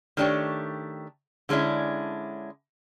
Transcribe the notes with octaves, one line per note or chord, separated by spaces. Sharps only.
D#3 A3 D4 G4 C#5
D3 G#3 C#4 D4 E4